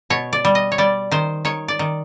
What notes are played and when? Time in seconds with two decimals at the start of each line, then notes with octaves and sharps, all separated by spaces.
0.10 B2 C#5
0.33 D5
0.45 G3
0.55 D#5
0.72 C#5
0.78 G3 D5
1.12 D#3 C5
1.45 D#3 C#5
1.68 D5
1.79 D#3